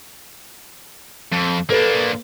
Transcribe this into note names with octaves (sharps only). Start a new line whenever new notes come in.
F2
A#3 D4 A4 B4